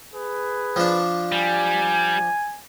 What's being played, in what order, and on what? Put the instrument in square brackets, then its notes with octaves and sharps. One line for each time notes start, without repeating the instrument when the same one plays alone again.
[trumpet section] G#4 B4
[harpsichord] F3 D4
[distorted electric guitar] G3 [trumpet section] G#5